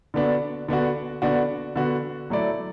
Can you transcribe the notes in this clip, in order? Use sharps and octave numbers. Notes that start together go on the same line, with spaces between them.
D3 B3 D4 F#4
D3 B3 D4 F#4
D3 B3 D4 F#4
D3 B3 D4 F#4
F#3 A3 E4 D5